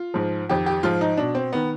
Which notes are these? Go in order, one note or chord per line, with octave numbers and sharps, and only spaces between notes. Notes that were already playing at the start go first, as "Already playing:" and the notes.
Already playing: F4
G#2 F3
F2 D#3 G4
G4
G#2 F3 F4
D#4
B2 D4
C4
D#3 B3